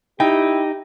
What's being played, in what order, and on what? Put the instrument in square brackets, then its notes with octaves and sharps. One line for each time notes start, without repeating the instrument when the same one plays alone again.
[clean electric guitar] D#4 [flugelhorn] E4 [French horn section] G4 [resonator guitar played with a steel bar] G5